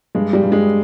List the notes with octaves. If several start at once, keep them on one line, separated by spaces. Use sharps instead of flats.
G2 G#3
G3
G2
G#3